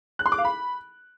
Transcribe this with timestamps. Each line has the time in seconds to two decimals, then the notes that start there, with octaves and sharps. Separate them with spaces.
0.19 F#6
0.26 C6
0.32 D6
0.38 F5
0.45 B5